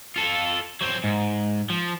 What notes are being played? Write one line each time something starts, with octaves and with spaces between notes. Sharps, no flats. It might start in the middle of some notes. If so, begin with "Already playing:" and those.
F4 A4
F#3 C4
G#2
F3